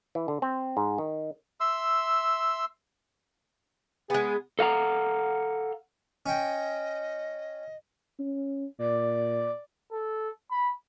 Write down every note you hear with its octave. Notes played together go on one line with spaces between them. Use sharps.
E3
D3
C4
G#2
D#3
E5 C6 E6
G#3 B3 G#4
A4 F5 F#5 A#5
C#4 D#5 G5
C#4
A#2 D5
A4
B5